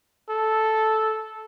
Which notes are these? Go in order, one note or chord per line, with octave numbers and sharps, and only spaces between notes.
A4